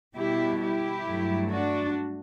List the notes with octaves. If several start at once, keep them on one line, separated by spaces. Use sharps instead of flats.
B2 G3 E4 G4
E4 G4
G2 F#3 A3
D4 F#4